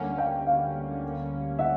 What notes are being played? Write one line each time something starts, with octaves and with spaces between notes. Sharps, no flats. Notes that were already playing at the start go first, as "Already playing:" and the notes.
Already playing: D2 D3 G3 A#3 C#4 F#5 G#5
F5 G5
F5
E5 F#5